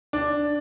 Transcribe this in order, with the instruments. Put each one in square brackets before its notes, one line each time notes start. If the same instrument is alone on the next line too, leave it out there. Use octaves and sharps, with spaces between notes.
[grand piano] D4